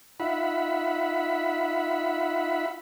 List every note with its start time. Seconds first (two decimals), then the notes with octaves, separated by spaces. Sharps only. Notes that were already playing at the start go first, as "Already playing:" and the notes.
0.20 D#4 F4 E5 F#5 B5